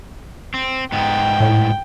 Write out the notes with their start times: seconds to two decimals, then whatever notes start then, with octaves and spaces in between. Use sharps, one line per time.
0.54 C4
0.92 G#2 B3 G5
1.41 A2